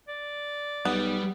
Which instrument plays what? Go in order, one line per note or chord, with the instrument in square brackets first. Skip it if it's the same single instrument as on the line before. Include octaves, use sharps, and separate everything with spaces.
[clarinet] D5
[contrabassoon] B1 [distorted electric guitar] G3 [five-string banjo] B3